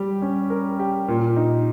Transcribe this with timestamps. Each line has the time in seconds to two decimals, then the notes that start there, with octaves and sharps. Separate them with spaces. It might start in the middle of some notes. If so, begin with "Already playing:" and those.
Already playing: G3 G4
0.22 C#4
0.50 A#4
0.79 G4
1.08 A#2
1.36 D#4